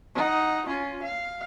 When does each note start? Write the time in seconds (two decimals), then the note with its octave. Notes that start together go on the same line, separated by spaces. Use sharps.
0.15 D#4 F#5
0.66 C#4 F4
1.02 F5